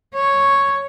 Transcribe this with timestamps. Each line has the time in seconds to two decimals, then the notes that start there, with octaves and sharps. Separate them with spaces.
0.14 C#5